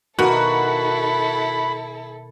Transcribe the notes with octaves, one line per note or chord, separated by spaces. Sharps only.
B2 D#3 A#3 E4 F#4 A4 B5